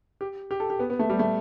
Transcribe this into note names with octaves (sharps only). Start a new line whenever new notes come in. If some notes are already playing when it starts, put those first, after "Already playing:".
G4
G4
A4
G4
B3
B3
A3
G3
A3